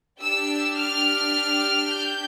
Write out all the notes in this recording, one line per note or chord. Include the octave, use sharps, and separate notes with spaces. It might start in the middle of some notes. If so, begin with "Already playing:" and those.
D4 G4 E6
F6
G6